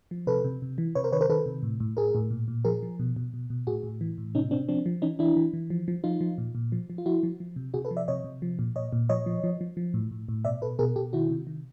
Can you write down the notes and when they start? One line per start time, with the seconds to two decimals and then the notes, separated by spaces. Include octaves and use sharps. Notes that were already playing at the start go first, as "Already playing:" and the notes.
0.11 F3
0.27 C3 A4 B4
0.45 C3
0.62 C3
0.78 E3
0.95 C3 B4 C#5
1.04 A#4 C5
1.12 D#3 B4 C#5
1.21 A#4 C5
1.29 D#3 A4 B4
1.46 C3
1.63 A2
1.80 A2
1.97 A2 G#4 A#4
2.15 A2
2.31 A#2
2.48 A#2
2.65 F3 G#4 A#4
2.83 F3
2.99 B2
3.16 B2
3.34 B2
3.50 B2
3.67 A2 F#4 G#4
3.83 A2
4.01 E3
4.18 A2
4.35 C3 C#4 D#4
4.51 C3 C4 D4
4.68 F3 C4 D4
4.86 F3
5.02 E3 C#4 D#4
5.19 E3 D4 E4
5.36 E3
5.53 E3
5.70 F3
5.88 F3
6.04 F3 D#4 F4
6.21 F3
6.38 A#2
6.55 A#2
6.72 F3
6.90 F3
6.98 F4
7.06 F3 E4 F#4
7.23 F3
7.40 F3
7.56 C3
7.74 C3 F#4 G#4
7.85 A4 B4
7.91 F3
7.97 D5 E5
8.08 C3 C#5 D#5
8.24 C3
8.42 F3
8.59 A#2
8.76 A#2 C#5 D#5
8.93 A#2
9.09 F3 C#5 D#5
9.26 F3
9.44 F3
9.61 F3
9.77 F3
9.94 A2
10.11 A2
10.28 A2
10.45 B2 D5 E5
10.62 B2 A4 B4
10.79 B2 G#4 A#4
10.96 B2 G4 A4
11.13 D#3 E4 F#4
11.29 C3
11.47 D#3